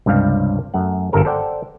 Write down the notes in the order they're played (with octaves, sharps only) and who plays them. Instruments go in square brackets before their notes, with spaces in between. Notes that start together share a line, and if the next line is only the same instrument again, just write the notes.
[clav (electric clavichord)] C#2 G2 C3 G3 F5
F#2 A3 F#5
G1 G2 A4 A#4 C5
A4 C5 D5 F#5 G5